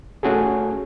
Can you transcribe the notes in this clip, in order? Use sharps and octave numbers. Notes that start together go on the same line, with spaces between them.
A3 C#4 F#4 G#4 A4